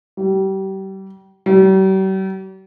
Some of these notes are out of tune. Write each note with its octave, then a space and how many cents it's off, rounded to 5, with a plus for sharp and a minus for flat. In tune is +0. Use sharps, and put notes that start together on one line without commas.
G3 -30
G3 -45